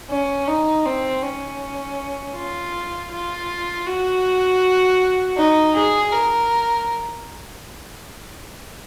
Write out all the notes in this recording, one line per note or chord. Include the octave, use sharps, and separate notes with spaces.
C#4
D#4
C4
C#4
F4
F4
F#4
D#4
G#4
A#4